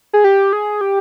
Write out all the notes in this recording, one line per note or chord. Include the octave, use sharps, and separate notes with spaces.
G#4
G4
G#4
G4